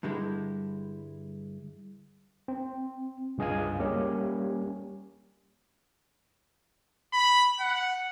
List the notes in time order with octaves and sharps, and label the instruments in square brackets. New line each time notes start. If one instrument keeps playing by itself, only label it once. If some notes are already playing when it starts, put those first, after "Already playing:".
[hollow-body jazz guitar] G2 D3 G3 G#3 E4
[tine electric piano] C4
C#2 G2 G#4 D#5 F5 G#5
G3 A#3 C#4 G4
[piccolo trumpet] B5
F#5